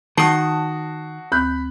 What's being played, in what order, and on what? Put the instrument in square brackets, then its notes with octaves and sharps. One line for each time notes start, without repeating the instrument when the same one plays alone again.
[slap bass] D#3 [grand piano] F#4 C7 [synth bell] A5 D#6
[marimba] D2 G6 [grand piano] B5 F#6